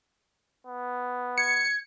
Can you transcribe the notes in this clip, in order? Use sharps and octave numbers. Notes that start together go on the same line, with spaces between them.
B3
G#6 C#7